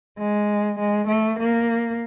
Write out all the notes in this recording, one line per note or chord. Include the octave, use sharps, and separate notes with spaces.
G#3
G#3
A3
A#3